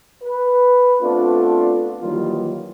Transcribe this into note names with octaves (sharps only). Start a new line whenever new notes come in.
B4
A3 B3 C4 D4 F4
D#3 E3 F#3 G3 A#3 F4